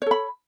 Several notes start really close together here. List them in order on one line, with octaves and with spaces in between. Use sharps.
C#5 A4 B5